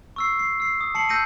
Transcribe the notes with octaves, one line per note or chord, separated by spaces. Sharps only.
C#6 E6 C7
C7
E6 C7
D#6
A5 C7 C#7 F#7
E6 G6 A#6 C#7 D#7